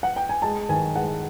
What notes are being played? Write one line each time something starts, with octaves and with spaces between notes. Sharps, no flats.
F#5
G5
G#5
G#3 A5
D#3 G#5
G#3 F#5